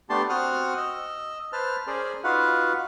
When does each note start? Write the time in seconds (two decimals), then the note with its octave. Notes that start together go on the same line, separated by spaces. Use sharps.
0.10 A3 B3 D4 G4 A5 C6
0.29 C4 F#4 F#5 D#6 F6
0.77 D#5 E6
1.52 B4 C5 A5 F6
1.87 C#4 G#4 A#4 C5 D5
2.24 D#4 F4 F#4 B4 F5 F#5